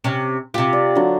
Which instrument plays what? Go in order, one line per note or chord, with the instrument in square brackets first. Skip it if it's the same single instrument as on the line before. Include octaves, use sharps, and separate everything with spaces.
[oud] C3 C#4
[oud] C3 G4 [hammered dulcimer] F4
[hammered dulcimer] D5
D3 F#3